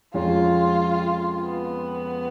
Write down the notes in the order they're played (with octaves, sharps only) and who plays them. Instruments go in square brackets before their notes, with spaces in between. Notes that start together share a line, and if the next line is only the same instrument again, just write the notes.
[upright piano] F2 F3 G#3 C#4 [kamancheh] F4
[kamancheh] B3